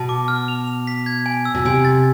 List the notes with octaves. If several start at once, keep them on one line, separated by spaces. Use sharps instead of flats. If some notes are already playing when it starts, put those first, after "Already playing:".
Already playing: B2 A5
D6
F6
F7
F7
B6
G#6
G#5
E6
B2
C3 G#5
A6